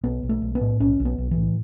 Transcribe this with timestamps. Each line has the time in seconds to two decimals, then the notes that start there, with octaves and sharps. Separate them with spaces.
0.04 B1 B3
0.23 B1
0.29 A3
0.42 B1
0.55 B3
0.61 A2
0.80 B1 C#4
1.00 B1
1.05 B3
1.18 B1
1.31 E3
1.37 A2